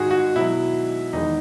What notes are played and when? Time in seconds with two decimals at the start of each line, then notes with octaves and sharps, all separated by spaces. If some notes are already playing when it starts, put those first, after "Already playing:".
Already playing: G#2 D#3 G#3 F#4 G#4
0.11 F#4
0.36 B2 F#3 E4
1.13 E2 D#3 G#3 D#4